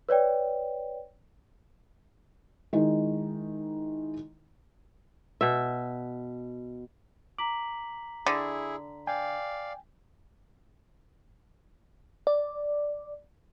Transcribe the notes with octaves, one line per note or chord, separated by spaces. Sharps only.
B4 C#5 D5 G5
D#3 G#3 D#4 E4
B2 E5
A#5 D6 B6 F#7
D3 E4 G#4
D5 F5 G5 G#5
D5